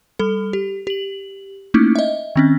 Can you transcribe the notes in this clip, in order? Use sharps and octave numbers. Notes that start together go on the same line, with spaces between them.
G3 A4
G4
G4 F#7
A3 A#3 C#4 D#4 E4
D#5 E5
D#3 C4 C#4